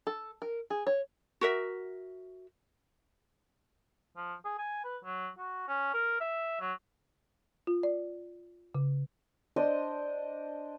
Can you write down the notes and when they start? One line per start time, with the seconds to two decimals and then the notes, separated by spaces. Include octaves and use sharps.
0.07 A4
0.42 A#4
0.70 G#4
0.87 C#5
1.41 F#4 A#4 E5
4.16 F3
4.45 G#4
4.59 G#5
4.84 B4
5.04 F#3
5.38 F#4
5.68 C#4
5.94 A#4
6.20 E5
6.60 F#3
7.67 F4
7.83 D5
8.75 C#3
9.56 D4 C5 D#5 E6